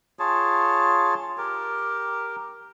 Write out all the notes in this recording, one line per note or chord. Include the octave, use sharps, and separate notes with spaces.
F4 G#4 C#5 A5
G4 A#4